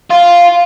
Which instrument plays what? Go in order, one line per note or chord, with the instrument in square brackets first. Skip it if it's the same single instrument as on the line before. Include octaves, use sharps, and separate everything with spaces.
[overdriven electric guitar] F4